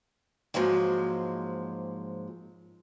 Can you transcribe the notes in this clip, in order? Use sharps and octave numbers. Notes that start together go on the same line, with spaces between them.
G#2 F3 F#3 G#3 A#3